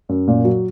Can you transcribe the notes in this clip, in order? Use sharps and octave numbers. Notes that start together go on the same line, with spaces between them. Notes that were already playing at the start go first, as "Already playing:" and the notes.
F#2
A#2
F#3